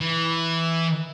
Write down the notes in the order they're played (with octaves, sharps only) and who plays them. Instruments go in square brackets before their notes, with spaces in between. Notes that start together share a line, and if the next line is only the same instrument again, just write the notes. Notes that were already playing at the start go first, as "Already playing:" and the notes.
[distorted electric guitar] E3